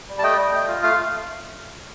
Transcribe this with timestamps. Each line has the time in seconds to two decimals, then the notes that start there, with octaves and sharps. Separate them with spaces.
0.09 G3
0.18 A5
0.23 A3 D#5 G5
0.38 A3
0.53 A3
0.68 F4
0.83 A3 F5